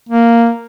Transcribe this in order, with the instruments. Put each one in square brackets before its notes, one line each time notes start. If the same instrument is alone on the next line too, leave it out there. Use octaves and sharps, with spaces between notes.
[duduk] A#3